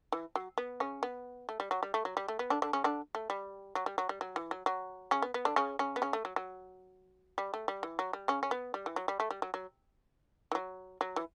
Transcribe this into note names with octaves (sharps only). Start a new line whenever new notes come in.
E3
F#3
B3
C#3 C#4
B3
A3
G3
F#3
G3
A3
F#3
G3
A3
B3
D3 D4
D3 D4
C#3 C#4
D3 D4
A3
G3
F#3
G3
F#3
G3
F#3
E3
F#3
F#3
C#3 C#4
B3
B3
D3 D4
C#3 C#4
C#3 C#4
B3
C#3 C#4
A3
F#3
F#3
G3
A3
G3
E3
F#3
G3
C#3 C#4
C#4
B3
G3
E3
F#3
G3
A3
G3
F#3
F#3
E3
F#3
F#3
E3